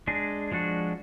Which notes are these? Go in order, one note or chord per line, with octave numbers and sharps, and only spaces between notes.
G#3 D4 G#4
F3 G#3 D4 F#4